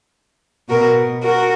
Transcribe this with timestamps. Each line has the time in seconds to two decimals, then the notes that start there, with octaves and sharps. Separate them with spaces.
0.69 B2 F#4 A#4
1.23 F#4 A#4